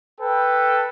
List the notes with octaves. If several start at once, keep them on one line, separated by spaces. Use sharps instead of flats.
A4 B4 G5